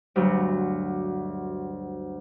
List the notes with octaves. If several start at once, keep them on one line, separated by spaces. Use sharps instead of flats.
D2 G2 F#3